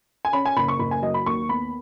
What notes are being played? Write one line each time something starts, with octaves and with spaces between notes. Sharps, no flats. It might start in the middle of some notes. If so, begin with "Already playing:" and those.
G#5
C#4 B5
G#5
F#1 B5
C#6
F#1 B5
G#5
F#3 D#5
B5
D#2 C#6
B3 B5